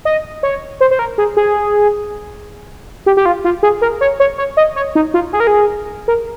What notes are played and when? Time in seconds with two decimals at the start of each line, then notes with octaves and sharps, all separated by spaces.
0.05 D#5
0.43 C#5
0.81 C5
0.91 C5
0.99 A#4
1.18 G#4
1.37 G#4
3.06 G4
3.17 G4
3.26 F4
3.44 F4
3.63 G#4
3.82 A#4
4.01 C#5
4.20 C#5
4.38 C#5
4.57 D#5
4.76 C#5
4.95 D#4
5.14 F4
5.33 G#4
5.40 A#4
5.47 G#4
6.08 A#4